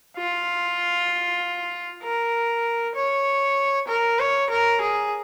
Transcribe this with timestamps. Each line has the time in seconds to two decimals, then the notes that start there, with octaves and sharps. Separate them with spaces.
0.17 F4
2.04 A#4
2.95 C#5
3.88 A#4
4.20 C#5
4.51 A#4
4.82 G#4